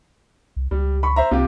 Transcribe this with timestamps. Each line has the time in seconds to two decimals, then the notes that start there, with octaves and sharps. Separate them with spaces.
0.56 C2
0.71 C#2 G3
1.03 B5 C#6
1.16 C5 E5 A#5
1.31 C2 C3 F4 G4